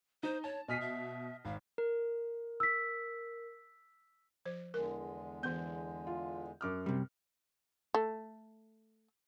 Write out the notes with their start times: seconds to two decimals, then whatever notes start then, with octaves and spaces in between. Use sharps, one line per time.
0.23 D#4 C5
0.44 C#5 A5
0.68 B2 D#5 G#5 F6 B6 C7
0.81 E5
1.45 G#1 F5
1.78 A#4
2.60 E6 B6
4.46 F3 C5
4.74 E2 D3 G#3 A#4
5.43 E3 B3 G6
6.07 F4
6.61 F#2 D6 F6
6.86 C3 G3
7.94 A3